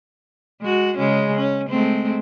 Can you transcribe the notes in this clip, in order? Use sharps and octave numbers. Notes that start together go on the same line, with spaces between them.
G#3 F#4
C#3 G#3 C#4
C#4
G#3 A3 C4